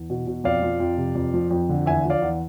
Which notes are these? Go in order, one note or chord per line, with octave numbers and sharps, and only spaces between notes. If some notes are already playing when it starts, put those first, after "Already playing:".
Already playing: E2
B2
B2
F2 D5 F5
F3
F2
C3
F2
F3
F2
D3
E2 E5 G#5
F3
D5 F5
E2